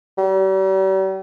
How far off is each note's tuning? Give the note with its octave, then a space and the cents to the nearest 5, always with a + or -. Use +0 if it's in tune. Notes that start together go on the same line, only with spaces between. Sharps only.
G3 -40